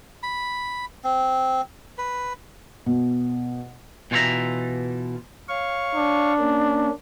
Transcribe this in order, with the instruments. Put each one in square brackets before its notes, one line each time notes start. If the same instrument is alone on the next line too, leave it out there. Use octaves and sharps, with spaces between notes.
[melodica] B5
C4
B4
[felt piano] B2
[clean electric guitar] B2 E3 F4 C#5 E5 A#5
[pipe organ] C#5 F5 C#6
[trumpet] D4
[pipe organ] A#3 C#4